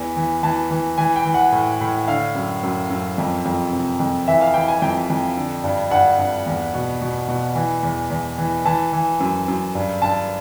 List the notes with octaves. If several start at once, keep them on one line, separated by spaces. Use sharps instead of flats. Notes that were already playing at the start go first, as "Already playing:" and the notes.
Already playing: E2 E3
E3
E3 A5
E3
E3 G#5
G5
E3
F#5
A2
A2
D3 F5
F#2
F#2
F#2
F2
F2
C3
F2
E3 E5
F5
E3 G5
G#5
F2 G5
F2
D3
G2
G2 F#5
G2
E2
B2
B2
B2
E3
E2
E2
E3
E3 A5
E3
F#2
F#2
G2
G2 A5